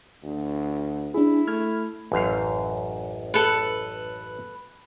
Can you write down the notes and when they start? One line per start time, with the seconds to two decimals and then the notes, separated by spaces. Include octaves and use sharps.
0.23 D2
1.14 D4 E4 G#4
1.47 A3 F6 G#6
2.12 A1 F#2 F5
3.34 A4 B4